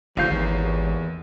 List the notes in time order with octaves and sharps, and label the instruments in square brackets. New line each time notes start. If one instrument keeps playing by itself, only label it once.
[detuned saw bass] F#1 [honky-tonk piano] D#2 C7 [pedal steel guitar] D3 F5 G6 [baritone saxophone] F3
[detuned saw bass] G#1 [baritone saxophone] E2 [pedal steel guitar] C#5 A#5 B5